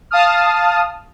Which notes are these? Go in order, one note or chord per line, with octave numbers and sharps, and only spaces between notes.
F5 A5 D#6 F6